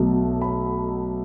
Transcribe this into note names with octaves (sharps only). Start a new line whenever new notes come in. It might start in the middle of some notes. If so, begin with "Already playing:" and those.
Already playing: B1 B2 A3
B5